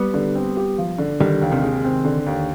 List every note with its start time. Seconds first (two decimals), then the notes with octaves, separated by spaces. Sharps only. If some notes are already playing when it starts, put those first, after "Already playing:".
Already playing: G3 B3
0.14 D3
0.35 C4
0.57 G4
0.78 F3
0.98 D3
1.20 D3 D#3 G3
1.42 D#2
1.52 C3 D#3
1.63 G#3
1.85 C4
2.05 D3
2.26 D#2